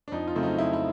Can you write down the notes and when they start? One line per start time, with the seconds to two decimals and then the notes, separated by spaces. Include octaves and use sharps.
0.08 D4
0.12 F2 D#4
0.27 F4
0.35 C#3 F#3 A3 C4
0.43 D#4
0.58 F2 E4
0.73 E4